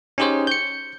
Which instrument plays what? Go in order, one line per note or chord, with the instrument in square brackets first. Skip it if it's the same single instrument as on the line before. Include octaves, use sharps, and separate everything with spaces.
[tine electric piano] C#4 D#4 G4 G#4 C5 C#5
G6 C#7